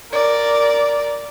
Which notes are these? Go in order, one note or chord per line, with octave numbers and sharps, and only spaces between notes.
A#4 D5